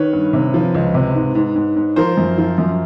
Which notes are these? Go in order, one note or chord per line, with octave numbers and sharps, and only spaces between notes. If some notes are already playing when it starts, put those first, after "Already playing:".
Already playing: D#3 B4 C#5
G2
C3
F3
C#2
C3
G#2
G#2
G#2
G#2
F3 A#4 C5
F#2
F3
F#2